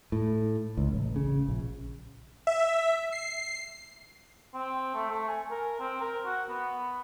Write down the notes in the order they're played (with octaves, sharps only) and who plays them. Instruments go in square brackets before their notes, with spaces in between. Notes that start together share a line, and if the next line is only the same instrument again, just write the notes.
[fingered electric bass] A2
C#2
A1
C#3
A#1
[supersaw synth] E5
C7
[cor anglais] C4
A3
A3
G#5
A#4
C4
A#4
F#4
B3